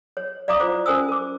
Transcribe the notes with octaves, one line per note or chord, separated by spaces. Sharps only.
C#5
D5 F5 A#5 D6 D#6
E4 F4 C5 F5 D6
C#4 A#4 C5 G#5 D#6 E6
A#4 D6